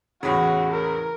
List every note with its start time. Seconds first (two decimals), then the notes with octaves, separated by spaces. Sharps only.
0.23 E2 A2 C#3 F#4
0.72 A#4